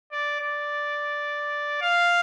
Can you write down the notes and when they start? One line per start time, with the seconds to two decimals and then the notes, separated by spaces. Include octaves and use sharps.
0.12 D5
0.40 D5
1.81 F5